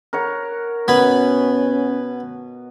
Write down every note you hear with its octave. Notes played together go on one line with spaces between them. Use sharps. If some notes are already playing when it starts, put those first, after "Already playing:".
A#4 C#5 F#5
B2 B3 C#4 G#5 B5